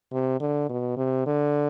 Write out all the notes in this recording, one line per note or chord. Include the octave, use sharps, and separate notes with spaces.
C3
D3
B2
C3
D3